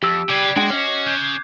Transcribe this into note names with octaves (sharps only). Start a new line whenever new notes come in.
F2 G4 E6
C#3 B4 D5 G5 D6 G#6 C7
G#3 D4 F#4 G5
C#4 C#5 D#5
C#3 F#6 G6